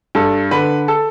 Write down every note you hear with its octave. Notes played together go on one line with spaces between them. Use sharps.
G2 A4
D3 B4
A4